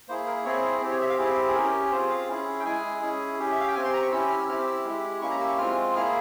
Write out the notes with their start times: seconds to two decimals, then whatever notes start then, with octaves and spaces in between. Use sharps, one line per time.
0.08 A#3 E4 G#4 C5
0.27 A#4
0.45 C4 E4 G#4 C#5
0.82 C4 G4
0.91 C#5
1.01 E5
1.09 F5
1.18 C4 E4 G4 G#4
1.48 G#4
1.55 C#4 G4 A#4
1.92 C4 F4 G#4 C5
2.10 F5
2.28 C#4 E4 G#4
2.60 G5
2.65 G#3 E4 G#4 G#5
3.02 C#4 E4 G#4
3.39 C#4 G4
3.52 E5
3.60 F5
3.68 G5
3.75 C4 G4 G#5
3.85 C6
3.93 A#5
4.02 C#6
4.11 C#4 E4 G4 E6
4.30 F6
4.41 E6
4.48 C4 E4 G4 F6
4.67 E6
4.85 G#3 E4 G4
5.21 A#3 C#4 E4 G4 C#6
5.31 A#5
5.40 E6
5.49 C#6
5.58 G#3 C4 F4 F6
5.95 A#3 E4 G#4 F6